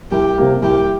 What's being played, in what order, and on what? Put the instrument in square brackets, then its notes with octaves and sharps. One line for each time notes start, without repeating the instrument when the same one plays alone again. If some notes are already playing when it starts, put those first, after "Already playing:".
[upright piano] C2 [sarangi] G4
[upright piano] C3 G3 A#3
[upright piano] C2 [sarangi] G4